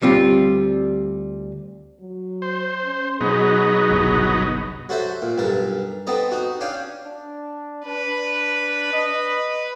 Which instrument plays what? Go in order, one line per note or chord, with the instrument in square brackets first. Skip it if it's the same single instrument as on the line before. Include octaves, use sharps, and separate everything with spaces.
[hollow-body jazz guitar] D2 G3 C4 F4
[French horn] F#3
[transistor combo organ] C5
[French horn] C#4
[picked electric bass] B2 [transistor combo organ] F#3 B3 D#4 [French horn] G#4
[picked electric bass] G1 C2 B2
[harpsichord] F#3 F#4 A4 C5 E5
A#2
B1 G2 A4 A#4
B3 C4 A4 D#5 A#5
D#4 F#4
C#4 D4 F5 G5 G#5
[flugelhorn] D4
[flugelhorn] D4 [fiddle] B4
[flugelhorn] D#5